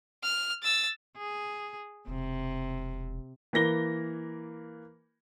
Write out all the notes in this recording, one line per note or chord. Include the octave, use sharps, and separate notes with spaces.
F6
E6 A6
G#4
E1 C3
E3 A#3 A#6 G7